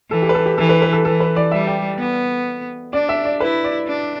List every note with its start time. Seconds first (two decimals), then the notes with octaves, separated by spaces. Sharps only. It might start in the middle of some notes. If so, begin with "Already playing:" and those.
0.10 E3 A4
0.22 G4
0.29 B4
0.34 A4
0.46 G4
0.58 E3 A4
0.69 B4
0.82 B4
0.93 A4
1.05 E3 A4
1.20 B4
1.36 D5
1.51 G3 E5
1.67 G5
1.99 B3
2.93 D4 D5
3.09 E5
3.25 D5
3.40 E4 B4
3.64 D5
3.87 D4